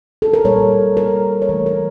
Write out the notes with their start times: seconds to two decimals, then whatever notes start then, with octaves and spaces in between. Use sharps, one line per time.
0.22 A4
0.34 A#4
0.45 A#2 G3 A#3 C#5
0.97 A#4
1.42 C#5
1.49 E3 A3 A#4
1.66 A#4